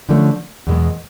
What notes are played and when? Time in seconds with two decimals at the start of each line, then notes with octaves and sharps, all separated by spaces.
0.09 D3 F3 A3 C#4
0.67 E2 B2 G#3